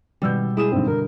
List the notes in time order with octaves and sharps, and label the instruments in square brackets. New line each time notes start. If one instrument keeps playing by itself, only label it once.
[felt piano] G#1 E6 G6 [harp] B2 G3
[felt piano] G#3 [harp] E4 D#6 E7 [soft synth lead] G#4
[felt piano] G#2 D3 D#3 [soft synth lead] C4
[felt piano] D3 [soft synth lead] A#4